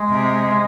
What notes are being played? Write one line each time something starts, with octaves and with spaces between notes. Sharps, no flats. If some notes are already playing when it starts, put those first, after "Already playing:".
Already playing: G#3
C3